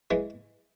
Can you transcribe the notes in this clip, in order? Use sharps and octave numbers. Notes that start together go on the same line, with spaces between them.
E3 G#3